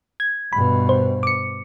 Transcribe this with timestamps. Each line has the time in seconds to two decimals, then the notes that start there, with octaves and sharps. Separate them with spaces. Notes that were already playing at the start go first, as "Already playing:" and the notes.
0.20 G#6
0.53 G2 B2 B5
0.89 C5
1.23 D6 C#7